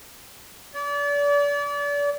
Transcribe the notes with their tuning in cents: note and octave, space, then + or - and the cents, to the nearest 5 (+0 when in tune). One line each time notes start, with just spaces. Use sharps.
D5 -35